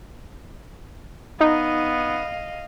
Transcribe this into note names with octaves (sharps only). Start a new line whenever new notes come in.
B3 D#4 D#5 F5